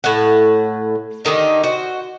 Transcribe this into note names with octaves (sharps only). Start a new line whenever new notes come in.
A2 F#5
D3 D#3 D#4 G4
F#4 C5